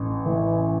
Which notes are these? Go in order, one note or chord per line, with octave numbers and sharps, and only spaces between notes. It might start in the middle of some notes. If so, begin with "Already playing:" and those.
Already playing: A1
E3